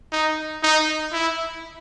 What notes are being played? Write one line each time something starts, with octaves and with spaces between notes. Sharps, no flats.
D#4
D#4
E4